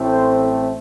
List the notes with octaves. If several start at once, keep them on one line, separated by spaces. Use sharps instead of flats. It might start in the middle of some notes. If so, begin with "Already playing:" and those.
Already playing: A1 A2 A3 C4
C5